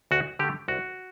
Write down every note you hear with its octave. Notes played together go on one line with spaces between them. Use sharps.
D2 F#4
D3 A3 G4
C2 F#4